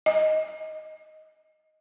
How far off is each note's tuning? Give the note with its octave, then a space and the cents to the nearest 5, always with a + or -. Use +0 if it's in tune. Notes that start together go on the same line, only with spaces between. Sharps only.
D#5 +5